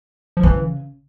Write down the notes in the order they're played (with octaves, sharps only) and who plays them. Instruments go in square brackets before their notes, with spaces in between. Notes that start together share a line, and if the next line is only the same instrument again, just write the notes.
[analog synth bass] F3
[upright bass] C#3 [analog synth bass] E3